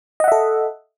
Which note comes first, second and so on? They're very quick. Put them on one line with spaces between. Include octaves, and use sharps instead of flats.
D#5 F#5 E5 A4